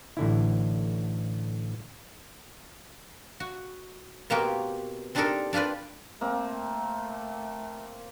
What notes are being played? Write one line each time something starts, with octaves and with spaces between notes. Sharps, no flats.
A1 D3 E4
F#4
B2 A#3 C4 F#4 G4 A#4
C4 D4 D#4 G4 A4 A#4
D4 F4 G4 B4 D5
A3 A#3 C4